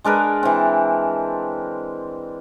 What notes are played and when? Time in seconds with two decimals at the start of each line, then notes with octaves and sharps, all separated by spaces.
0.04 G#3 D4 A#4 B4
0.43 E3 C4